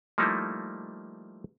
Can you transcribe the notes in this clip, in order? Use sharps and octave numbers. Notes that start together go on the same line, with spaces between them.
F3 G3 A3 A#3 D#4 E4